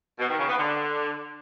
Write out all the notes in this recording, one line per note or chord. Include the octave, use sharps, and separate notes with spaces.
B2
D#3
C#3
B3
D3